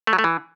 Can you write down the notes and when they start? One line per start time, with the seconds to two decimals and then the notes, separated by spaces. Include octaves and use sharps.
0.07 A3
0.13 F#3
0.19 A3
0.24 E3